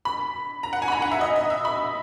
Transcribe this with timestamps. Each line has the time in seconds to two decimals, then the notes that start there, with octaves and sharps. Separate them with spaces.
0.05 B5
0.63 A#5
0.73 F#5
0.82 G#5
0.88 B5
0.92 A#5
1.02 F#5
1.11 E5
1.21 D#5
1.36 D#5
1.50 E5
1.65 B5